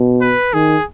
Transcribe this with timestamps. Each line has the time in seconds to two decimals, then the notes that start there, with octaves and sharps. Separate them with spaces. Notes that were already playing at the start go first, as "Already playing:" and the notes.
Already playing: B2
0.21 B4
0.54 D#3 G#4